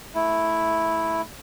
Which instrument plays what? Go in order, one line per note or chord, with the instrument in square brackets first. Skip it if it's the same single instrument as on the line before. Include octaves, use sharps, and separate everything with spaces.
[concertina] A3 E4